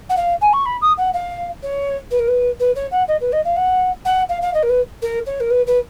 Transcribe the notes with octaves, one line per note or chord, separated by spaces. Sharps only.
F#5
F5
G#5
C#6
B5
D#6
F#5
F5
C#5
B4
A#4
B4
B4
C#5
F#5
D#5
B4
D#5
F5
F#5
F#5
F5
F5
D#5
A#4
B4
A#4
C#5
A#4
B4
B4